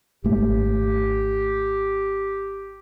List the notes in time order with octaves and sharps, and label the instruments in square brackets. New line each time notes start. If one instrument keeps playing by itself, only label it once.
[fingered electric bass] G#1 A3 [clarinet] G4